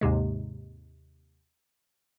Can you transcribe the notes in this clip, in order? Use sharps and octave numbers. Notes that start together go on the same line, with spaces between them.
D#2 G#2 C3 G#3